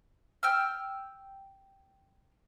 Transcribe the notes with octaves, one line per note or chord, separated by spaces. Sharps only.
G5 E6 F6